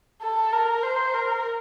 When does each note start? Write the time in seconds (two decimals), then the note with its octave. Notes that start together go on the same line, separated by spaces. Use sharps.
0.22 A4
0.52 A#4
0.83 C5
1.14 A#4